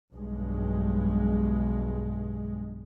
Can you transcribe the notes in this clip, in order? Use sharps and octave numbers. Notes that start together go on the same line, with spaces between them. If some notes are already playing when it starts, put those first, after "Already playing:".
B1 G2 G#3